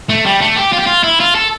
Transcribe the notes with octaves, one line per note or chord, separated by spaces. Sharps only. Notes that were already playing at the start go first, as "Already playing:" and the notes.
A3
G3
A3
G4
F4
G4
F4
E4
F4
A4